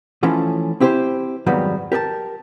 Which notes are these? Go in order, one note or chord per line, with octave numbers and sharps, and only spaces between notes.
E3 F3 A3 C#4
C4 E4 G4 B4 C5
F2 G#2 D#3 F#3 G3 B3
G4 A#4 D5 A5